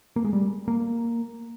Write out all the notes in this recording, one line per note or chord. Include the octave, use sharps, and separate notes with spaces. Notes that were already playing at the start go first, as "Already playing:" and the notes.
A#3
G#3
G3
A#3